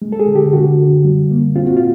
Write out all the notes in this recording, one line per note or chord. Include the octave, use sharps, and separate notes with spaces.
G#3
A4
G#4
D3
G4
D3 F#4
D3
G3
A#3
C4 F4
F#4
F4